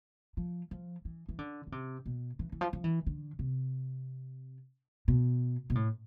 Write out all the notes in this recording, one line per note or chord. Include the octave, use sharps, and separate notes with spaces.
F3
F3
E3
E3
D3
D3
C3
B2
E3
E3
F3
F3
E3
D3
C3
B2
B2
A2